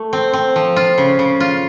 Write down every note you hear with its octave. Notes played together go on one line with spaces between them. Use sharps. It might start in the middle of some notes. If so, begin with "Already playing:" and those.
Already playing: A3
C4
C4
F3
F4
C#3
C#3
F4